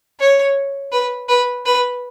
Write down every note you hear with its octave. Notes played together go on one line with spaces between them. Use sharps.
C#5
B4
B4
B4